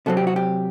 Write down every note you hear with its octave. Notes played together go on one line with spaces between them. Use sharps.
C3 F#3 C4 A4
G4
F#4
G4